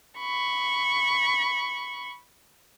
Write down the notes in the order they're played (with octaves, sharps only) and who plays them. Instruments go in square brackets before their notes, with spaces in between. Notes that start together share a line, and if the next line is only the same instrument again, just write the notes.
[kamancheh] B5 C#6